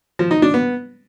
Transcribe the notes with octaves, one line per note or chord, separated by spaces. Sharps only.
F3
D#4
D4
B3